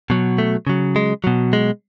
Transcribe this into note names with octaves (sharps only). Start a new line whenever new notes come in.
B2 F#3
A3
C#3 F#3
G#3
B2 F#3
G#3